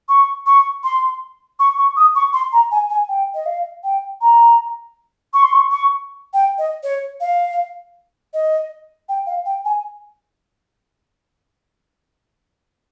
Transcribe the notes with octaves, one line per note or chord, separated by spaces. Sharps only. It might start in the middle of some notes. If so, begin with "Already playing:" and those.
C#6
C#6
C6
C#6
C#6
D#6
C#6
C6
A#5
G#5
G#5
G5
D#5
F5
G5
A#5
C#6
C6
C#6
C#6
G5
D#5
C#5
F5
D#5
G5
F5
G5
G#5